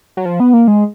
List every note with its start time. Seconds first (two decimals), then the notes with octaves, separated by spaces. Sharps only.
0.17 F#3
0.25 F3
0.40 B3
0.54 A#3
0.68 G#3